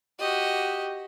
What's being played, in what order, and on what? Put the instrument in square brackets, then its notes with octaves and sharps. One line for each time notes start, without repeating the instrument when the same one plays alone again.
[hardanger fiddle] F#4 D#5 [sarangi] G4